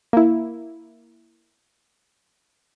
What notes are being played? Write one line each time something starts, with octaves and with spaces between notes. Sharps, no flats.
A#3 E4